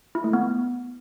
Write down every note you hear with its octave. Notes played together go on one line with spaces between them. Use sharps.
E4
A3
B3